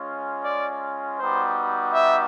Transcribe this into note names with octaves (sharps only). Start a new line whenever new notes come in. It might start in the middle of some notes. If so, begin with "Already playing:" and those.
Already playing: G#3 C#4 F4
D5
G3 B3 D#4 F#4 C5
E5